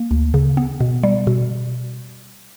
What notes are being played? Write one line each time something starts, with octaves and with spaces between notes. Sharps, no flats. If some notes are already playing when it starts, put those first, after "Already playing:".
Already playing: A#3
D2
C#3
B3
B2
G3
B2